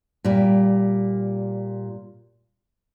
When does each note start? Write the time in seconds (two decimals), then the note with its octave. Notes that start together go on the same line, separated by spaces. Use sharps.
0.24 A#2 G3